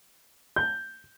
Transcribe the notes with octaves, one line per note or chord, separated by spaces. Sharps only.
G6